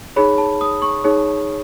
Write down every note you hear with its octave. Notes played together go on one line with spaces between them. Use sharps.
D#4 G#4 C#5 B5
A5
D#6
C#6
D#4 G#4 C#5